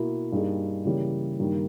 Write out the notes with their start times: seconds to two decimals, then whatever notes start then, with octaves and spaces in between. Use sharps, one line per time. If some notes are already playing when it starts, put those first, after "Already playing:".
Already playing: B2 A#3 E4
0.32 G2 G3 A#3 D#4 G#4
0.85 C#3 E3 G3 A#3
1.39 G2 D#3 G3 A#3